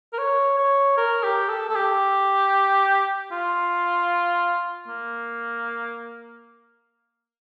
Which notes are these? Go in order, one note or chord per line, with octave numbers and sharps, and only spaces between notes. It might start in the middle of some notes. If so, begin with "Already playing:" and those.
A#4
C#5
C#5
A#4
G4
A4
A4
G4
F4
A#3